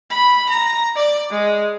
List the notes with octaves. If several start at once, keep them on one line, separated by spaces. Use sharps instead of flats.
B5
A#5
D5
G#3